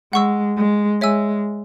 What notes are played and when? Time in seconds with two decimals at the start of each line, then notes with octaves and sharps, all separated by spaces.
0.13 G#3 F#5 C#6 E6
0.57 G#3
1.01 G#3 C#5 E5 G#5 E6